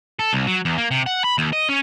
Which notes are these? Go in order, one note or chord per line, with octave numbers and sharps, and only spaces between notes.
A4
C2
F#3
E2
A#3
C3
F#5
B5
D#2
D#5
C#4